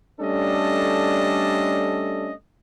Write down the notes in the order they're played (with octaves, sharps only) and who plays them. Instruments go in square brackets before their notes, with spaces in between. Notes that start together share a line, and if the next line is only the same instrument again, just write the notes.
[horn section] G3 A3 C#4 D4 A4 D#5